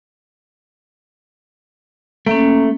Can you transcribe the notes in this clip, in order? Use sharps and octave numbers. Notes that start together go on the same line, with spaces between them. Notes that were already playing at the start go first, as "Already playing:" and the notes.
A3 A#3 C#4